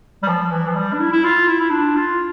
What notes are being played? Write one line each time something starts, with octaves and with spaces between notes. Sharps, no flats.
G3
F3
E3
F3
G3
D4
E4
E4
F4
E4
E4
D4
F4